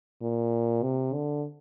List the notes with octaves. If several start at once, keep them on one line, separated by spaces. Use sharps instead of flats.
A#2
C3
D3